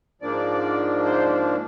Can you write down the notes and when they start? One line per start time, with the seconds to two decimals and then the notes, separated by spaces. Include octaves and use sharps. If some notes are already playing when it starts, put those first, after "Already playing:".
0.22 G#2 F3 A#3 D4 D5
1.05 C5